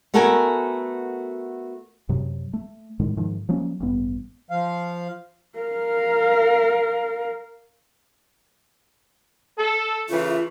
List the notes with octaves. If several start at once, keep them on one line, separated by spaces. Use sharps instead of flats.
A3 B3 F#4 A4 A#4 G#5
F#2 C3 F#3
A3
A2 D#3 G#3
G#2 D#3 F3
F3 F#3 A#3 C#4
A1 G2 B3
F3 F5
A#4 F5
A4
C#3 E3 A3 F4